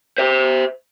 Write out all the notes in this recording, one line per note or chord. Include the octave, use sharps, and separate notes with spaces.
C5 E5